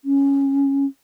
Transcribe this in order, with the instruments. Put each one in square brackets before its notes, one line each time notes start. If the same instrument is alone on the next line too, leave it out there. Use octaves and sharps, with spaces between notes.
[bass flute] C#4